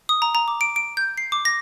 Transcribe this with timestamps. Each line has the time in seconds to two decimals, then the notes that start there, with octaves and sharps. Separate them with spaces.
0.09 D#6
0.22 A#5
0.35 A#5
0.48 D6
0.61 D7
0.76 D7
0.97 G6
1.17 C7
1.32 D6
1.45 A#6